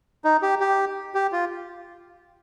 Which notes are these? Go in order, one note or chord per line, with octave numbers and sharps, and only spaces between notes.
D#4
G4
G4
G4
F4